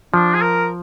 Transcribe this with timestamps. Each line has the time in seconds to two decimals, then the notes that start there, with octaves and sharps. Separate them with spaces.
0.14 F3 D4
0.34 G#4
0.41 A#4